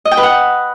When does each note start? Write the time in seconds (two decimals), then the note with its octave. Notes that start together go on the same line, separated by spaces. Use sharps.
0.05 D#5
0.11 G5
0.17 B4
0.23 F#5